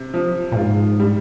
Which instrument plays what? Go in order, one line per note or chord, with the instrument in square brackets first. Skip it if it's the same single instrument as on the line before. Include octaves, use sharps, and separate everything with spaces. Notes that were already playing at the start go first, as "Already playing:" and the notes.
Already playing: [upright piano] C3
F3
[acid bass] A#2
[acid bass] G#2 [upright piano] F4
[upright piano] G3